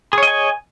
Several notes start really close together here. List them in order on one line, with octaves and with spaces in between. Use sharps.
G#4 C#5 D#5 G#5